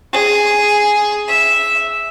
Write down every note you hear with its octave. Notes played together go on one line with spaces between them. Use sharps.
G#4
E5